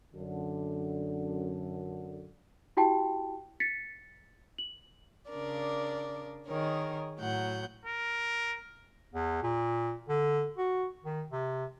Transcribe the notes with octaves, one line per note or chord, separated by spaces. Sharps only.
F#2 D3
E4 F#4 G4 G5 A5
A6 B6 C#7
F#7
C#3 D4 A#4 D5
D#3 G#4 A#4 C#5
A2 F#3 F#5 G6
A#4
E2
A#2
D3
F#4
D#3
C3